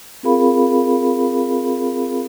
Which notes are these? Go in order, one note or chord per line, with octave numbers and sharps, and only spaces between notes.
C4 F4 G#4 A#4 F5 B5